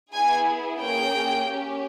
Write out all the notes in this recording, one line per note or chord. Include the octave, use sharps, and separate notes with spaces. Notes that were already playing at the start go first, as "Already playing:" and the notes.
B3 E4 G#4 G#5
A#3 C#4 G#4 G5
C#4 G4